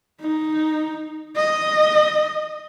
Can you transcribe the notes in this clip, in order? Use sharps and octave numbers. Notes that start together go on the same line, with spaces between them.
D#4
D#5